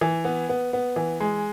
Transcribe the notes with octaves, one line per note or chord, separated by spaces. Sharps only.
E3
B3
B3
B3
E3
G#3